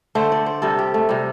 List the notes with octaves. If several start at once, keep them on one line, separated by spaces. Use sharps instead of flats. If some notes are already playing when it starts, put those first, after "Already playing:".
D3 A3 C5
D5
C5
C3 G3 A4
G4
A3
C3 G3